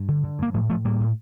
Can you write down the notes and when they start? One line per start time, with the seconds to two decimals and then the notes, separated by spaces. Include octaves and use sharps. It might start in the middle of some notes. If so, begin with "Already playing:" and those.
Already playing: G2
0.08 D3
0.24 D3
0.39 G2 A#3
0.54 A2 F3 A3
0.69 A2 F3 A3
0.85 A2 G3 A#3
1.00 A2